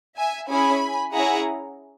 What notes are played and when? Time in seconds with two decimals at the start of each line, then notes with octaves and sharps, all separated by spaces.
0.16 E5 G#5
0.49 C#4 E4 G#4 G#5 B5
1.14 C#4 E4 G#4 F#5 A#5